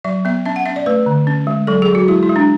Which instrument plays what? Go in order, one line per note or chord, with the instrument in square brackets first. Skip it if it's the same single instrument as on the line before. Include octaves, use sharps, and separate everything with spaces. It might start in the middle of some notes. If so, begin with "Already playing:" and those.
[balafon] F#3 E5
B3 E5
C#4 E5
F#5
C#4 E5
D5
A3 B4
D3
C#4
G#3
F#3 A4
G#4
F#3
F#4
G#3 E4
E4
G#3
D4